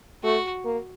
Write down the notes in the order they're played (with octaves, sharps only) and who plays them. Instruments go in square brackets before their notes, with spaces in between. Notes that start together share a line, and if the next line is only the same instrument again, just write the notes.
[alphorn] A3 [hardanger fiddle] F#4
[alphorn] A#3